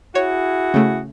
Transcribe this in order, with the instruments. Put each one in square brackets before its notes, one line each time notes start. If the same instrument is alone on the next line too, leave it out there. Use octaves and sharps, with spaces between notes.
[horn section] E4 F#4 G#4 [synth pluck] C#5
[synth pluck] C#3 A3